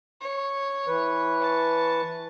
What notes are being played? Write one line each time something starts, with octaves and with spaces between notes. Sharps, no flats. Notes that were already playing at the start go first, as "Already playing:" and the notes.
C#5
E3 B4
A5 C#6